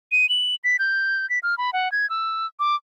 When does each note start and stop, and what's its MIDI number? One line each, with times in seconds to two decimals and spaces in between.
0.12 0.29 99
0.29 0.55 102
0.64 0.77 95
0.79 1.28 91
1.30 1.39 95
1.43 1.57 89
1.58 1.73 83
1.73 1.91 78
1.92 2.09 92
2.10 2.47 88
2.59 2.76 86